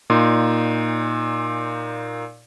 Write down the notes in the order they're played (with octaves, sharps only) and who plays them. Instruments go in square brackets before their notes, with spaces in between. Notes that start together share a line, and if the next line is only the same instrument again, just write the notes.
[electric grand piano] A#2 D#4 C6